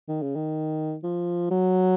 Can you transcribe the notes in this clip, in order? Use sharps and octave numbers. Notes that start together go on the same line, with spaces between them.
D#3
C#3
D#3
F3
F#3